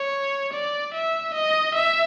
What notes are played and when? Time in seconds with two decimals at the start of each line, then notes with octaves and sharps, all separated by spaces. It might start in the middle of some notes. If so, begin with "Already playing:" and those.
Already playing: C#5
0.53 D5
0.94 E5
1.34 D#5
1.75 E5